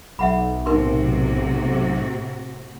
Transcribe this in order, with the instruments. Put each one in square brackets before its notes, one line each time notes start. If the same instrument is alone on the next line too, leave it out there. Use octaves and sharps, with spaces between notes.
[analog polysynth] B1 [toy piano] E5 F#5 B5
[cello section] A2 C3 F#4 [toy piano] D#4 A#4 C6